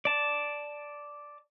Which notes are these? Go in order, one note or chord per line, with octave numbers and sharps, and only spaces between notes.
D5 A5